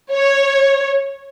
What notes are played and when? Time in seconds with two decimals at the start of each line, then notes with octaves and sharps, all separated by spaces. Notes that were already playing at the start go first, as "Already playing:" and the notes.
0.12 C#5